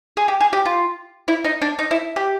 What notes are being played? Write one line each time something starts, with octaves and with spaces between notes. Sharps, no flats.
G#4
G4
G#4
G4
F4
E4
D#4
D4
D#4
E4
G4